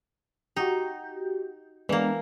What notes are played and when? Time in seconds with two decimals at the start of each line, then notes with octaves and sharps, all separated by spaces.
0.56 D#4 F#4 G4
1.89 E3 G#3 A#3 B3 D4